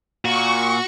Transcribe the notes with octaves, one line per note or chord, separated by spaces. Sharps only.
A#2 F#4 C#6